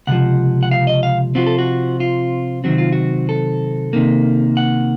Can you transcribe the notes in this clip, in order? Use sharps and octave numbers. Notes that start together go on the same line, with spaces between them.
C#2 C3 F3 F#5
F#5
F5
D#5
F5
C3 F3 C4 F4 F#4
A4
F#4
F4
C3 D#3 F#3 C4 F#4
F4
F#4
A4
C3 D#3 A#3
F#5